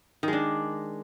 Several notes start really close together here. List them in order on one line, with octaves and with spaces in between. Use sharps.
D#3 G#3 D4